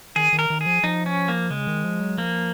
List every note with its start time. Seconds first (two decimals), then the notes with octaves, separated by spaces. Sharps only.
0.16 D#3 G#4
0.33 D#3
0.39 A#4
0.50 D#3
0.61 G#4
0.66 F3
0.83 F3 D#4
1.06 C#4
1.28 A#3
1.51 C#3 G#3
1.67 D#3
1.84 F3
2.01 F#3
2.18 F3 A#3